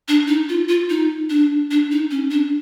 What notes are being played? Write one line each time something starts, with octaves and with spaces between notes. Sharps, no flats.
D4
D#4
F4
F4
D#4
D4
D4
D#4
C#4
D4